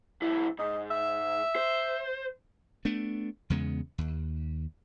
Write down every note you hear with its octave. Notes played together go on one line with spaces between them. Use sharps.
B1 E4
G#2 D#5
E5
C5
A3 B3 D4
E2 C#3 G#3 B3
D#2